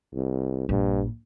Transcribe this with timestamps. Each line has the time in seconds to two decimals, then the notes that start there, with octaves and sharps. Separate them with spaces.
0.14 C2
0.69 A#1 G2